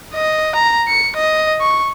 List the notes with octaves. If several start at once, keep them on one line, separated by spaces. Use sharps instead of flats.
D#5
A#5
C#7
D#5
C#6